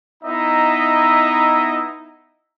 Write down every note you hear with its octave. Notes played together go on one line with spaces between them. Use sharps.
B3 D#4 E4 D#5 E5 A#5